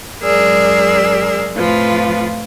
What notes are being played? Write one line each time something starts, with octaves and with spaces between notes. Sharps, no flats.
F#2 G#3 G#4 A#4 D5 E6
F2 A2 F3 F4 B4